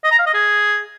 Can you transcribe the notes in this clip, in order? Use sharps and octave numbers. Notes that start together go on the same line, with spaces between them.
D#5
A#5
F5
D#5
G#4